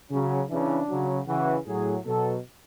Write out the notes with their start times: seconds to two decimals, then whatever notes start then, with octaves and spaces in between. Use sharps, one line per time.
0.11 C#3 F#3 C#4
0.49 C#3 E3 D4
0.89 C#3 F#3
1.27 C#3 E3 F#4
1.66 A2 F#3 G#4
2.05 B2 F#3 A4